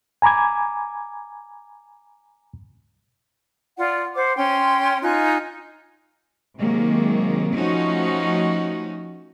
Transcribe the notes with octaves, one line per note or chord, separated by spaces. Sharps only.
G#5 A#5 B5 D6 G#6
F4 D5 F#5
C5 F#5 D6
C#4 G5 C6
D#4 F4 G#5 F#6
C3 D#3 F#3 G#3 A#3
F3 A3 C#4 D#4 F#4